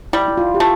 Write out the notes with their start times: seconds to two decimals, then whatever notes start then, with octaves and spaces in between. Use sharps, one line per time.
0.13 G3 E4
0.28 E4
0.37 F4
0.55 G4
0.60 A3 F4